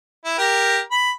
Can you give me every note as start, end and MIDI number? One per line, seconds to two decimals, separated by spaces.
0.25 0.34 64
0.38 0.79 67
0.38 0.79 70
0.91 1.12 83